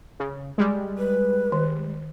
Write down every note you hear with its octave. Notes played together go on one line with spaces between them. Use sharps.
C#3
G3 G#3
B4
D#3